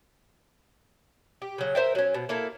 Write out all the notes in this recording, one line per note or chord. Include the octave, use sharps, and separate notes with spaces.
G4
C#3 F#3
A#4 C5 E5 G5
F#3 C#4
B2
A#3 E4 A4 A#4